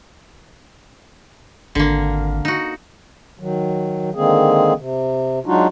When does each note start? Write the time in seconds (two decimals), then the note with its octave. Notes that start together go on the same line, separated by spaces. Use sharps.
1.75 G#1 D3 A#3
2.45 D#4 F#4
3.39 D#3 F#3
4.15 D3 D#3 G#3 A#3 C4 G#4
4.78 C3
5.46 F#3 G#3 D4 D#4 F4 F#4